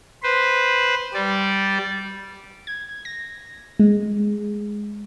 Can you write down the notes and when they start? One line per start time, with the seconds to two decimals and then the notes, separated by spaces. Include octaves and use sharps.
0.23 B4 C5
1.14 G3 D5
2.67 G#6
3.05 A#6
3.79 G#3